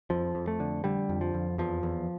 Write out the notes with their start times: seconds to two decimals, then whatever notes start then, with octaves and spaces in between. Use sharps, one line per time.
0.10 F2 F3
0.35 F2
0.48 A3
0.60 D3
0.84 D3 G3
1.09 F2
1.21 F3
1.34 F2
1.58 E2 F3
1.83 E2